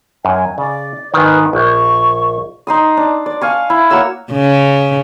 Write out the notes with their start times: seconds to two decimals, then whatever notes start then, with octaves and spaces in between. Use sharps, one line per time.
0.25 F#2 G#5
0.58 C#3 D5
1.14 G#2 D#3 B4
1.53 A#1 C#6
2.67 D#4 C6 D#6
2.97 D4
3.26 D5
3.41 F5 G#5 C#6
3.70 E4
3.90 A#3 F#4 C#5 E6
4.32 C#3